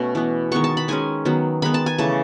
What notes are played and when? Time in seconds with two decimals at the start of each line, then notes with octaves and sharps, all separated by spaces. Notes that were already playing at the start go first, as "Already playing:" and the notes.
Already playing: B2 A3 C#4
0.15 E3 B3
0.52 D#3 G#3 B3 C#6
0.64 A5
0.77 B5
0.88 D#3 G#3 C#4 G#5
1.25 D#3 F#3 B3
1.62 D#3 G#3 B3 B5
1.74 A5
1.86 G#5
1.98 C#3 E3 A3 A5